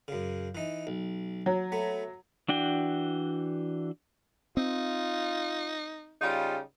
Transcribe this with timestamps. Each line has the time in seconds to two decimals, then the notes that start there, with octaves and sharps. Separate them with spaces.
0.08 F#2 C#3
0.55 E3 D#4
0.87 B1
1.46 F#3
1.72 A3 B3
2.49 E3 D4 F#4 G5
4.57 C4 D#4 F4
6.21 C#3 G3 D#4 F4